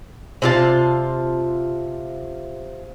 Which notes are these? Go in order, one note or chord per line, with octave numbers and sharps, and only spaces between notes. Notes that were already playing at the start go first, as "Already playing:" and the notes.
C3 F4 A5